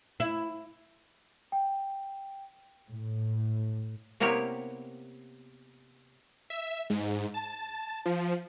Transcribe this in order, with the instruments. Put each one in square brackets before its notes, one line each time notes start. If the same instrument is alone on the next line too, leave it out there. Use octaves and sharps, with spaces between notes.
[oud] E4
[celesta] G5
[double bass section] A2
[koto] C3 A#3 B3 E4 G4 C#5
[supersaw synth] E5
G#2
A5
F3